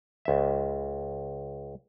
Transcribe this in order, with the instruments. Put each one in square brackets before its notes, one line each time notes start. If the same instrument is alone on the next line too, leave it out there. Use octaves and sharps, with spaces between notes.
[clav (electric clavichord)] C#2 E5